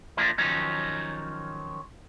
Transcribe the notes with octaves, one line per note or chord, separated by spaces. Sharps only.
F3 A3 A#3 D4
D#3 F3 F#3 C#4 D#4